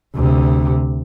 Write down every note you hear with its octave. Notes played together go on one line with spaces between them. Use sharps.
D2 C3